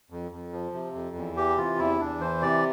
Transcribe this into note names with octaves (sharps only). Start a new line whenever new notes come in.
F2
F2
F3
C3
F2
E2
E3 G4
C3 F4
E2 E4
E2 D4
E3 C5
C3 D5